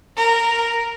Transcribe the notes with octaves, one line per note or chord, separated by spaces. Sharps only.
A#4